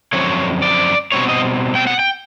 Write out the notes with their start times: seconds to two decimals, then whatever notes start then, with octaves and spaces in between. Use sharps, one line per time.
0.13 F#2 D3 F3 C4 C#5
0.62 D5
1.12 B2 G3 C4 C#5
1.29 D#5
1.75 G5
1.87 F#5
1.99 G5